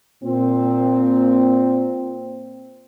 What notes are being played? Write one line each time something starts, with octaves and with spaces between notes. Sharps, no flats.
A#2 C4